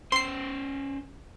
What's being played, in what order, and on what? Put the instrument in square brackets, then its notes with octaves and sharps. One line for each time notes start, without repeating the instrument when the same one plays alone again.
[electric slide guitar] C#4 C5 [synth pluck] C6 C7